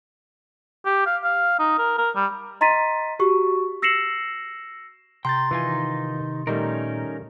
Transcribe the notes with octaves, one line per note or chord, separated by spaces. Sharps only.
G4
F5
F5
D#4
A#4
A#4
G3
D#5 A#5 C6 A6 B6 D#7
F#4 G4 C#6
E6 A#6 C7 C#7 E7 F#7
C3 G5 A#5 C6 G6 A6
D#3 E3 D#4 F4 G#5
A#2 D#3 G3 A3 C#4 D#4 A#4